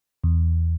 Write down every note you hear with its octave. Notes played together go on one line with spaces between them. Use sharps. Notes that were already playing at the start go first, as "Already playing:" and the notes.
E2